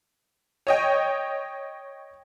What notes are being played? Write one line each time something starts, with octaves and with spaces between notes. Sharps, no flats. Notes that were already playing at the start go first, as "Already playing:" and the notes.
C#5 D#5 G5